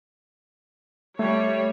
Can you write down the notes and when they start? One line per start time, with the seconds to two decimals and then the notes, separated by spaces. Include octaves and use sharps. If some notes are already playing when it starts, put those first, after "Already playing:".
1.19 G3 A3 C#5 E5